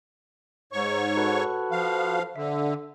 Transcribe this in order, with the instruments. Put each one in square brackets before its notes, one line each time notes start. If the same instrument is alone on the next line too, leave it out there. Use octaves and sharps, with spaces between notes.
[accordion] G#2 C#5 C#6
[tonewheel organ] F#4 A4 B4
[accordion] F3 F5
[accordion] D3 [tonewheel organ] E5